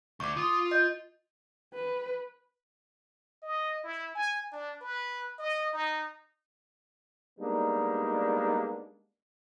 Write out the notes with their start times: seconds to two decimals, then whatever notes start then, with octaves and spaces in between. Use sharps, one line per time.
0.20 D2 C#6 D6
0.36 F4 C6 D#6
0.71 D#5 G6
1.74 B4
3.43 D#5
3.83 E4
4.15 G#5
4.52 D4
4.81 B4
5.39 D#5
5.73 D#4
7.40 G3 G#3 A#3 B3 D4 D#4